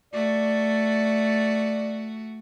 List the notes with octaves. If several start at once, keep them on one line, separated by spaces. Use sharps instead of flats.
A3 F#4 D5